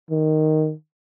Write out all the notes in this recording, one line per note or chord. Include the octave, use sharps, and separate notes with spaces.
D#3